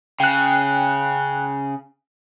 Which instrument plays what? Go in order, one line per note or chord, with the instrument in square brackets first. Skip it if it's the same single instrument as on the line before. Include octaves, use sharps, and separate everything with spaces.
[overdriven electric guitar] C#3 [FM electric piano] G5 F#6